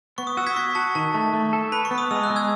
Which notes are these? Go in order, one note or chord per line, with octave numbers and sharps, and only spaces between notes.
B3 C#6
D#6
F#4 E6
G#6 B6
F#4 C#6
F#4 A5
D#3 A5
A3
A3
A4
B4 B5
C#6
B3
D#6
G#3 E6
F#6
G#3
E6 G#6